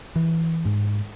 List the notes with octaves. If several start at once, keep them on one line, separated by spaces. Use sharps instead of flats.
E3
G#2